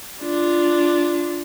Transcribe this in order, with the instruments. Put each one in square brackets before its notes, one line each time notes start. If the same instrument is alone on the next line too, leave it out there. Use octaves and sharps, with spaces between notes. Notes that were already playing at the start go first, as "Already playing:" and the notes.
[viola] D4 F4